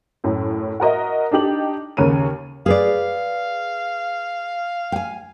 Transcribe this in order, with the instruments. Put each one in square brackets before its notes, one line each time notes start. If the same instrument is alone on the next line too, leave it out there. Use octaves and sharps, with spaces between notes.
[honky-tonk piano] F#2 A2
F#4 A#4 D#5 E5
D4 D#4 G4 F#7
D#2 C#3 A#4 C#5 D#7
[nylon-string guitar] G#4 B4 D5 [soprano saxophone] F5
[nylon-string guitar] G5 G#5